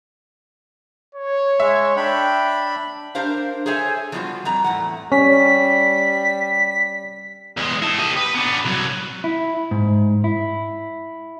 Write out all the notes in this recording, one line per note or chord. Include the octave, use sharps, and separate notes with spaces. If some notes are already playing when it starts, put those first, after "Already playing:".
C#5
G#3 E5
D4 G5 B5
D4 G4 A#4 C5 F5
G#4 A4 C5 C#5 E5 G#5
F3 G3 B3 F4 F#4
F2 G3 A#5
E2 A2 F#5
G3 C#4 B6
E2 G#3
E4 A5
G4 D#5
B4
B3 D4
C2 F#3
E4
G#2
E4